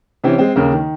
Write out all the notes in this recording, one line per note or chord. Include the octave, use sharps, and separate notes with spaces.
C3 E3 C4 C#4
G#3 C4
D#2 C#3 A#3
D#3